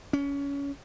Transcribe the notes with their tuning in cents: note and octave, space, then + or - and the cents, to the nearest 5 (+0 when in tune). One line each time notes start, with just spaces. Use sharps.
C#4 +25